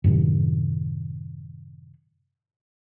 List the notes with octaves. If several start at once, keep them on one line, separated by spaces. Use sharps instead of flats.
F#2 A2 C3 D#3